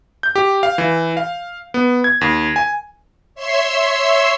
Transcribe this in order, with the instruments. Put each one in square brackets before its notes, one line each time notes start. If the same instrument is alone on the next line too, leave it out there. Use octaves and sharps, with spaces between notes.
[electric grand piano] G6
G4
F5
E3
F5
B3
G#6
D#2
G#5
[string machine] C#5 E5 C6 E6